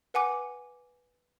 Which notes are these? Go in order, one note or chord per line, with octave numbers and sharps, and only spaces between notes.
B4 F#5 G#5 D6 C#7